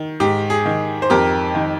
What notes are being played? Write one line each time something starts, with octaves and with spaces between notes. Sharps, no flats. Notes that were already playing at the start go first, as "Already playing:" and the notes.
Already playing: D#3
G#2 G4
G#4
D#3
C5
F2 G4 A#4
D#3